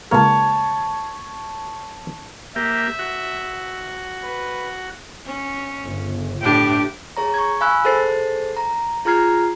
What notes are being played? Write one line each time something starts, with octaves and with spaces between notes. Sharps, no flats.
C#2 A#3 A#4 C#5 A5
A#3 G4 E5
F#4
B4
C#4
G1 C#3
A2 D4 G4
G#4 C#5 A#5
C#6 G#6
F5 G#5 B5 E6 F#6
G#4 A4 C5 A6 C7
A#5
F4 G#4 A#5 F6 G#6 C7